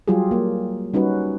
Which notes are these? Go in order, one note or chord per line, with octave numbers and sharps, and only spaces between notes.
F#3 G3 F4 G4 G#4
A#3
G3 C#4 D#4 F#4 B4